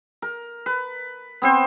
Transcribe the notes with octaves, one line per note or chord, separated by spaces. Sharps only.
A#4
B4
B3 C4 C5